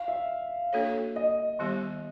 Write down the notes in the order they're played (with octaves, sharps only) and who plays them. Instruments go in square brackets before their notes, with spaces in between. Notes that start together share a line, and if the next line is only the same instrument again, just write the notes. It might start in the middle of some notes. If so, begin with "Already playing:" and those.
Already playing: [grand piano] F5
E5
[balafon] A#3 D4 F#4 A4 C#5
[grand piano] D#5
[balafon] D#3 G3 B3 E4 G4